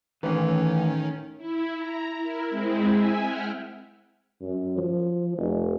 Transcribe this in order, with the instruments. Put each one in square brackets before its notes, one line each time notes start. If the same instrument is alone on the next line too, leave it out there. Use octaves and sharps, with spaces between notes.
[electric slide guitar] A2 E3 B4 [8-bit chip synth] D#3 C#4
[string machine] E4
A#5
E4 A#4
G#3 C4 E4
E5 G#5
F#5 G5 F6
[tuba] F#2
F3
F1